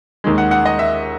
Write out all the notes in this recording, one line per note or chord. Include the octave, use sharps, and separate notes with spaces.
D#2 D#3 G#3
F#5
F#5
D#5
E5